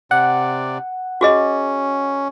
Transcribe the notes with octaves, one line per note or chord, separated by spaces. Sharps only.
C3 D5 F#5
C#4 F#4 G#4 D#5